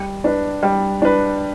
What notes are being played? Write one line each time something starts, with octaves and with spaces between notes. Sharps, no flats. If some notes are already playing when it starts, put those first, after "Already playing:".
Already playing: G3
D4 B4
G3
D4 B4